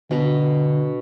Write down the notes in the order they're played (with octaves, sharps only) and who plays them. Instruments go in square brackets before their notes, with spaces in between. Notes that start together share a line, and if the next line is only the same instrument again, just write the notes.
[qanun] B2 B4 A#5 [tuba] D3